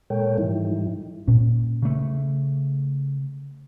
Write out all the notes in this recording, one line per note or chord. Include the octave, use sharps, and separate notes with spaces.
A#2 G#3 A4 A#4 C#5 G5
G#2 E3 F3 G3 D#4 E4
A#2 C#4
C#3 A3